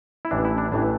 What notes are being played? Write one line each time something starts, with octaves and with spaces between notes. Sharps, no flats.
E4
A1 A2 E3 D4
E4
D4
A1 A2 E3 D4